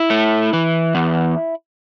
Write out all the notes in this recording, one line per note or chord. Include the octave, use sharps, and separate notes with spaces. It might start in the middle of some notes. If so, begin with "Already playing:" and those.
Already playing: E4
A3
E3
E2